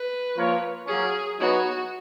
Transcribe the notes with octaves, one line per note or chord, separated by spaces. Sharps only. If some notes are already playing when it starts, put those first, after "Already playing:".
Already playing: B4
F3 A#3 F4 A#4 C#5
F#3 A#3 C#4 G#4
F#3 B3 D#4 F#4 G#4 C#5